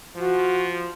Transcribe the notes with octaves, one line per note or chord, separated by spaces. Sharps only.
F3 F#4